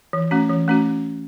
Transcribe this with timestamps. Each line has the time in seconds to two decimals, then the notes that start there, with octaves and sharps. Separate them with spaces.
0.13 E3
0.31 A3 C#4 F#4
0.49 E3
0.68 A3 C#4 F#4